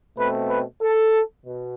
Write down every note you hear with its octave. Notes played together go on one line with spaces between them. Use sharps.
B2 A3 C4 B4
B4
A4
B2